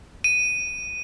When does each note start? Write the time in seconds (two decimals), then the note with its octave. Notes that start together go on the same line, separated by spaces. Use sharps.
0.24 D#7